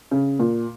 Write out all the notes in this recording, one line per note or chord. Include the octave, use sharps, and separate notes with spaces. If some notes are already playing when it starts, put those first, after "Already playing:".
C#3
A#2